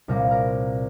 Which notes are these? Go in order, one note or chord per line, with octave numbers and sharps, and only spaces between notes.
C2 A#2 G3 A#4
A#4